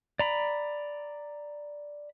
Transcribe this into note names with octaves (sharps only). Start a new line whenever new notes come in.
D5 A#5 B5